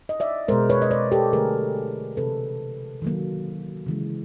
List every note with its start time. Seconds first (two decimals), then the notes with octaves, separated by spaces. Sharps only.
0.09 D#5
0.20 D5 E5
0.48 B2 G#3 A#4 C5
0.70 B4 C#5
0.82 D#5
0.91 C5 D5
1.12 G4 A4
1.33 D3 F#3 A3 G#4 A#4
2.17 C3 E3 A3 A4 B4
3.02 D#3 F#3 A#3
3.86 C#3 E3 G#3